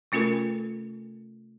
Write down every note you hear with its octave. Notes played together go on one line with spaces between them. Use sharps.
C3 A3 C#4 F4 A4 A#4